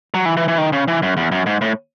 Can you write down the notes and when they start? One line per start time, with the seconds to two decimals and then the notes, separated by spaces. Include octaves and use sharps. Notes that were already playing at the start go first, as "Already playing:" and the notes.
0.14 F#3
0.25 E3
0.37 E3
0.48 E3
0.58 D#3
0.72 C#3
0.88 E3
1.02 F#2
1.17 E2
1.32 F#2
1.46 G#2
1.61 A2